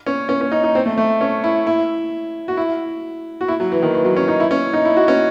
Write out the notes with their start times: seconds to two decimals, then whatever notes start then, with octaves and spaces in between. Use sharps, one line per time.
0.06 C#4
0.29 C#4
0.41 C#4
0.52 D#4
0.64 D#4
0.75 C4
0.86 A3
0.98 A3
1.21 C#4
1.44 E4
1.67 E4
2.48 F#4
2.57 E4
3.41 F#4
3.48 E4
3.60 F#3
3.72 E3
3.83 D#3
3.94 E3
4.05 F#3
4.16 C#4
4.28 D#4
4.40 E4
4.51 C#4
4.73 D#4
4.85 E4
4.96 F#4
5.08 C#4